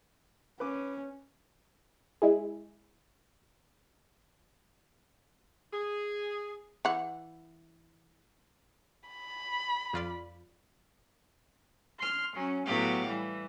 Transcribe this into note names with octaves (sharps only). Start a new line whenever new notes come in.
C#4 B4 D6
G#3 E4 G#4
G#4
E3 F#5
B5
F2 F4 D5
C6 F6
F#3 C#4
A2 F#3 B3 G4 F5
E3 G3